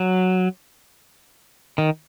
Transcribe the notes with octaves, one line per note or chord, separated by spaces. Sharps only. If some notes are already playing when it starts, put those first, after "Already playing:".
Already playing: F#3
D#3